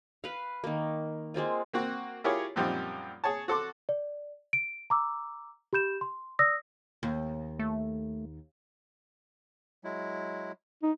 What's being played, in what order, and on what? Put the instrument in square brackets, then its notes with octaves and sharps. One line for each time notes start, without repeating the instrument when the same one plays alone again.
[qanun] B4 F5
D#3 A#3
G#3 A#3 C4 F4
[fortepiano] A#3 C4 F#4
E4 F4 G4 G#4 A#4 C#5
F#2 A#2 F3 G3 C4 D#4
G#4 C#5 A5
F#4 A4 C6 D6
[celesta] D5
D7
A#5 D6 E6
G4 B5 G6 E7
C6
D5 D#6 E6 A#6
[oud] D#2
[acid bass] A3
[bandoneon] F#3 G#3 E4
[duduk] D#4